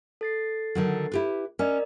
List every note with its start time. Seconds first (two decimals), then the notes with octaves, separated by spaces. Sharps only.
0.21 A4 A6 C7
0.75 D3 D#3 F#3
1.12 E4 G4 B4
1.59 C#4 A#4 D5 D#5